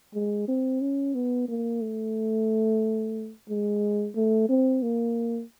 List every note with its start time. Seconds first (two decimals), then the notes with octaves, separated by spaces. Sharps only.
0.14 G#3
0.48 C4
0.81 C#4
1.15 B3
1.48 A#3
1.81 A3
3.49 G#3
4.16 A3
4.49 C4
4.83 A#3